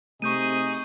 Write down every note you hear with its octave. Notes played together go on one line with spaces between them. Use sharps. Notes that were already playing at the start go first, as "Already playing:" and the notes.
C3 A3 D#4 G#4 C#6 G6 D#7